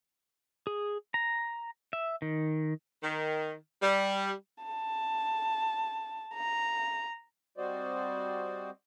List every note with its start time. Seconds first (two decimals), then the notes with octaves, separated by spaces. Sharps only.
0.67 G#4
1.14 A#5
1.93 E5
2.22 D#3
3.03 D#3
3.82 G3
4.64 A5
6.34 A#5
7.57 G3 C4 F#4 C5 D5 D#5